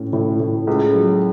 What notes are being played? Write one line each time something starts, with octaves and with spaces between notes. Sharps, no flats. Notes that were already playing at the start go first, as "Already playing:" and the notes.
Already playing: A2 C#4
A2
A2
C#2
F#3